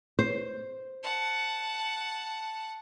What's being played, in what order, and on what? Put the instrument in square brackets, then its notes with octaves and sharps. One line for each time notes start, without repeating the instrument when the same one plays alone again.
[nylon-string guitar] C5
[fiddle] F#5 A5